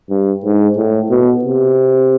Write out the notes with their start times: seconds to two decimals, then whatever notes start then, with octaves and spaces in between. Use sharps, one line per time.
0.10 G2
0.44 G#2
0.77 A2
1.11 B2
1.44 C3